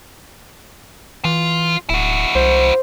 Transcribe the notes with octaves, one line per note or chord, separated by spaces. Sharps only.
E3 F4
D1 E4 F#4
C2 C5